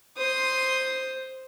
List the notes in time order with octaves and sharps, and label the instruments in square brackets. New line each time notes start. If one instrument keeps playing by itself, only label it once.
[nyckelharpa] C5 [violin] C6 D#6